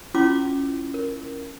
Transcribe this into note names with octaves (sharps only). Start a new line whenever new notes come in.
C#4 E4 F4 C6 D6
A#4